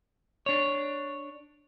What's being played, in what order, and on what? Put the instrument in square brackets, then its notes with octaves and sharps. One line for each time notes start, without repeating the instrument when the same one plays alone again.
[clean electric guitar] D4 C#5